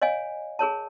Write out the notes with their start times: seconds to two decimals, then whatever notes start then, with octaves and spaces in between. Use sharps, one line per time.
0.02 C#5 D#5 F5 G#5
0.59 G#4 A#4 C#5 A5